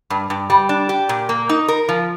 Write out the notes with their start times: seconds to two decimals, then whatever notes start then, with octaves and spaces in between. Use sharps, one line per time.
0.10 G2
0.30 G2
0.50 G3
0.69 D4
0.89 G4
1.09 A#2
1.29 A#3
1.49 D#4
1.68 A#4
1.89 F3